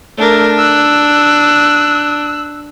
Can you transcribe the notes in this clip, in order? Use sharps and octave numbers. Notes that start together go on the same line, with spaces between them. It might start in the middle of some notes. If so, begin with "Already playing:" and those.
A3 D4 A#4
E6 F#6